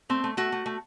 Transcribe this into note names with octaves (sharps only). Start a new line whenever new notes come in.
A3 C4
A3
A3 F#4
A3
A3